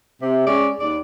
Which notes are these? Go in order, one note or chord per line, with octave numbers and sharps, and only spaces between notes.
C3
G#3 C#4 D5
D#2 D5